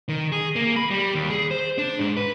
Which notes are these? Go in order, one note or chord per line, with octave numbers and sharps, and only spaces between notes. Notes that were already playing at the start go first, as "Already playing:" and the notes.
D#3
G#4
A#3
B5
G3
D#2
G#4
C5
D4
G#2
B4